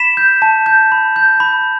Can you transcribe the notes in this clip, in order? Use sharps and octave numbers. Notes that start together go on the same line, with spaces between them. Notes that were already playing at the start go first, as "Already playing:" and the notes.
Already playing: B5 B6 E7
G6
A5
G6
B5
G6
B5